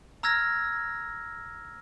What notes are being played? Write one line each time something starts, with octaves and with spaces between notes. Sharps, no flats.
A#5 E6 F6 G#6 A#6